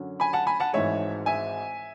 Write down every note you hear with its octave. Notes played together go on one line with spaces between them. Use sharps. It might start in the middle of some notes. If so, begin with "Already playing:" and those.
Already playing: F#2 D3 F#3 C#4
G#5 B5
F#5 A5
G#5 B5
F#5 A5
G#1 G#2 E3 G#3 C#5 E5
E5 G#5